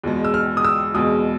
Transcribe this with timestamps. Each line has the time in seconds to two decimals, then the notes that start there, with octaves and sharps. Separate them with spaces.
0.04 E2 B2 G#3
0.25 E6
0.34 F6
0.57 D#6
0.64 E6
0.94 E2 B2 G#3 D#6